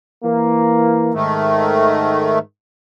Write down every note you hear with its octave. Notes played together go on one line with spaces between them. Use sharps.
E3 A#3
G#2 D#3 A3